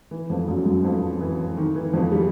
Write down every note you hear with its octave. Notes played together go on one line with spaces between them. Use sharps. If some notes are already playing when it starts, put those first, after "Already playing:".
E3
F2 F3
F#2 F#3
F#2 F#3
F2 F3
E3
D#3
E3
F2 F3
G3